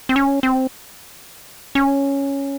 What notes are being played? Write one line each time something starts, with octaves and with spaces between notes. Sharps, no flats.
C4
C#4
C4
C#4